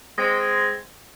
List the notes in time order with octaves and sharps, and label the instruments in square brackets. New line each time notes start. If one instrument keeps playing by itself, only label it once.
[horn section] G#3 C4